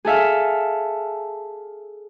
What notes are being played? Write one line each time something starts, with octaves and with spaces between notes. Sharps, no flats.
G#4 A4 E5 F5